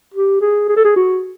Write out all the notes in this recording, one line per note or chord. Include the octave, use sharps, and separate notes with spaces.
G4
G#4
G#4
A4
G#4
F#4